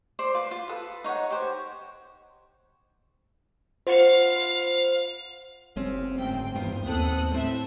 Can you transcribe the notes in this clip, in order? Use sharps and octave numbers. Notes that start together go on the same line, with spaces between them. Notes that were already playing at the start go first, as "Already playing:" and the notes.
C5 D5 C6
F4 B4 C6
F4
A4 B4 D#6
D#4 C#5 D#5 F#5
G4 C5 C#5
F4 C5 F5 F#5 C#7
F#1 C4 C#4 G4
D2 G#2 C4 G5
E2 G2 A#2 B3 C5 F5
D#2 B3 C4 A4 D#6 F#6
A2 C4 A4 E5